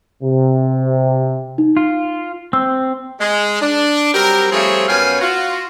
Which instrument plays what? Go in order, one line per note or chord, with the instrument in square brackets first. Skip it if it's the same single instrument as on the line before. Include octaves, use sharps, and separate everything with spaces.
[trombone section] C3
[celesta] D#4
[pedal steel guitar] F4
[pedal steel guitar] C4 [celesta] E6
[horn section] G#3
D4
F#3 G3 C4 G4 A#4
F3 G3 A3 C4 G#4 C#5
F#2 B3 C#4 F5 G5 G#5
F4 F#4